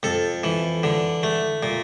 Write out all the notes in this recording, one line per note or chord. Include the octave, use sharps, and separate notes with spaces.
F2 A4
E3
D3
A3
A#2